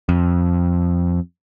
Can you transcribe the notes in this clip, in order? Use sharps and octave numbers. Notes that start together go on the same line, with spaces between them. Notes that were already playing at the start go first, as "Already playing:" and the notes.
F2